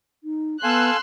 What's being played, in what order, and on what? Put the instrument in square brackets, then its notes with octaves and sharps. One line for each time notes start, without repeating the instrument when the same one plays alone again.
[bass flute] D#4
[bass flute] B3 [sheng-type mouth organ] A4 F5 G#5 [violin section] C6 E6 F#6